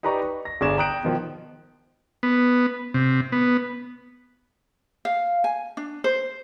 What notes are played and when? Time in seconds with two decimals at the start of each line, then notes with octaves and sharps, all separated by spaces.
0.03 D#4 G4 B4 D5 A#5 C#6
0.22 C#6
0.45 A#6
0.61 G1 G#4 D5 C#6 G#6 E7
0.77 G5 A#5 D#6 F#6 G6 D7
1.03 B2 D#3 F3
2.23 B3
2.94 C3
3.32 B3
5.05 F5
5.44 G#5
5.77 D4
6.04 C5